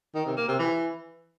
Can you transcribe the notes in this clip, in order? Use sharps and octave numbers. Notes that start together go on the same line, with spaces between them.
D#3
C3
A#3
C3
E3